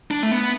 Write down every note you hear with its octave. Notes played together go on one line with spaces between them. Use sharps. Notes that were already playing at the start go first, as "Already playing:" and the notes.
D4
A3
B3